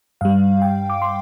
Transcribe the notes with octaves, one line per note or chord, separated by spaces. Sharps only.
G2 G3 F5
G5
D6
C6